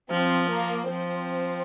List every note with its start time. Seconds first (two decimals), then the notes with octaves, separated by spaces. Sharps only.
0.10 F3 C4
0.51 A#3
0.89 F3 C4